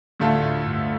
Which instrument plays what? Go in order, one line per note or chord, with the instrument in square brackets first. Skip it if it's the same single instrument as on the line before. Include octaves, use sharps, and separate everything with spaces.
[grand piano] D2 D3 A3 F4 A4 [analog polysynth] A2
[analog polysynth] A2
G2